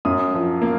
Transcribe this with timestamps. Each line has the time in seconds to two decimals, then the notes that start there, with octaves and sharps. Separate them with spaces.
0.05 F#2 D#6
0.34 F3
0.62 A#3